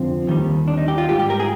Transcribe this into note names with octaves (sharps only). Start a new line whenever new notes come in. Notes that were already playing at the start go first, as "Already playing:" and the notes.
Already playing: F2 D3 F3 C4
D#2 D#3 G3
D4
D#4
G4
F4
G#2 G3 G4
G4
A#4
G#4